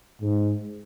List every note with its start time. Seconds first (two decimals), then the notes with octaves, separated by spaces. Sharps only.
0.21 G#2